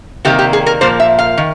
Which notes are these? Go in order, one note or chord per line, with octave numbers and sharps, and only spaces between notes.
C3 D#3 G3 A#3 G4
G4
G#4
A#4
A#2 F3 A#3 C5
E5
F5
D#3